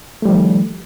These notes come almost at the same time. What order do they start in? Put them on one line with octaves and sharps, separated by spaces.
A3 G3 F3 D#3